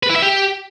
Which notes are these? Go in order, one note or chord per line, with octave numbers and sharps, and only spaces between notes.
B4
E4
E5
G4